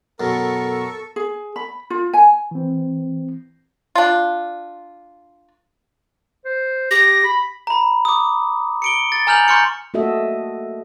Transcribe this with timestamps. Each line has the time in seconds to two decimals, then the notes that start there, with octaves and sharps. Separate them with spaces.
0.20 F#2 B2 A4 A#4 C#6
1.16 G#4
1.56 B5
1.90 F4
2.13 G#5
2.51 E3 C4
3.95 D4 F4
6.45 C5
6.91 G4 A#6
7.24 B5
7.67 A#5 B5
8.05 D6 D#6
8.82 C#7 D7 G7
9.12 A6
9.27 G#5 A#5 F6 G6 F7 F#7
9.48 A#5 C6 C#6 F6 G6 C#7
9.94 A3 A#3 F#4 A4 D#5 E5